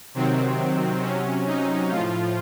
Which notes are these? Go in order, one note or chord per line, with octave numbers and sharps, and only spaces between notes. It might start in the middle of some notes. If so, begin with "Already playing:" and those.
C3 D#3 F#3 C4
C3 F#3 C#4
D#4
A2 F3 F4